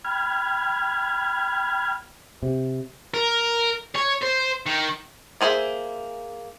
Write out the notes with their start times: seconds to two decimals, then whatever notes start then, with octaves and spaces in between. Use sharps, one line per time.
0.05 G5 B5 F6 G#6
2.43 C3
3.14 A#4
3.96 C#5
4.23 C5
4.66 D#3
5.41 A#3 G#4 C5 E5